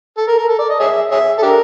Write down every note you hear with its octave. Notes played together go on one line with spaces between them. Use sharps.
A4
A#4
A#4
A4
D5
D#5
G#4 C#5 E5
G#4 C#5 E5
A4
D4 G4 A#4